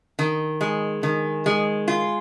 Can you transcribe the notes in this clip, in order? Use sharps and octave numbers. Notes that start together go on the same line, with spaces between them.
D#3
G#3
D#3
G#3
F4